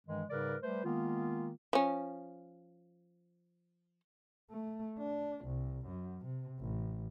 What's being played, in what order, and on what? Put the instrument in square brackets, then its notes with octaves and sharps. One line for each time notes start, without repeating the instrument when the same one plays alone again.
[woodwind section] G2 D#3 E3 G#3
G#2 C#3 G3 A#4 B4 D5
G3 A3 B4 C5
D#3 G#3 A#3 B3 F4
[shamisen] F3 C#4
[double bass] A3
D4
C2
F#2
C3
A1